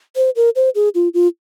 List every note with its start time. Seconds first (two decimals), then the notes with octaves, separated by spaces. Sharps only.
0.16 C5
0.36 A#4
0.56 C5
0.75 G#4
0.95 F4
1.14 F4